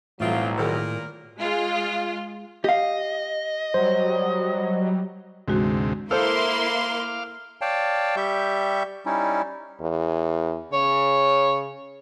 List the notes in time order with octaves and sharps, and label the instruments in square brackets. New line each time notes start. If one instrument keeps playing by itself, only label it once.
[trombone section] B1 F#3 [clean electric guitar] A2 [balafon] E3 G3 A4 [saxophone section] C4 F4
[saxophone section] A#2 A#4 [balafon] D#3 A3 G#4
[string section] G#3 F4
[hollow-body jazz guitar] G4 F5 [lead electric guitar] D#5
[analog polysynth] F#3 G3 [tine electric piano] C5
[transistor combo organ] D2 G#2 C3 [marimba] E3 G#3 F#4
[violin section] A#3 E4 C6 [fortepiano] A4 C5 [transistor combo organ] F5 D6 F6
[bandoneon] C#5 D5 F5 G5 A5
G3 G4 E5 C#6 G6
G3 C#4 D#4 E4
[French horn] E2
[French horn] C#3 [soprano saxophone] C#5